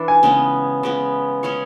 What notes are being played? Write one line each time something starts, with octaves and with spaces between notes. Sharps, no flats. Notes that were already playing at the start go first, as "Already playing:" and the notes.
Already playing: E3 D4
G#5
C#3 G#3 B3
C#3 G#3 B3
G#3 C#4 G#4 C#5